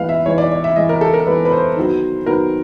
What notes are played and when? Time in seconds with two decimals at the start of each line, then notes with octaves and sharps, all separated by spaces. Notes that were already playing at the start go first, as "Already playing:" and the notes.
Already playing: E3 G#3 B3 B4 F5
0.09 E5
0.26 E3 G#3 B3 C#5
0.38 D5
0.52 D5
0.64 E5
0.76 E3 G#3 B3 D#5
0.89 A#4
1.01 A4
1.14 A#4
1.26 E3 G#3 B3 B4
1.45 B4
1.52 C5
1.76 D#3 F#3 B3
2.26 D#3 F#3 B3 A#4